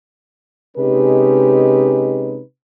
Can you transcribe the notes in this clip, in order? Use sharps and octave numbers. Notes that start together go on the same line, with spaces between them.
C3 G#3 C#4 D#4 G4 B4